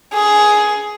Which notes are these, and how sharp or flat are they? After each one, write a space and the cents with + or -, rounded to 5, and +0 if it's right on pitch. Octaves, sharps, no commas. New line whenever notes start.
G#4 +10